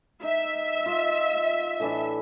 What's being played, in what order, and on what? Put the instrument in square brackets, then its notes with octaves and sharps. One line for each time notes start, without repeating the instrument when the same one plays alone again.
[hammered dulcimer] D#4 [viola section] E5
[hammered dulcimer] F4 D#5 F5
A2 E3 D4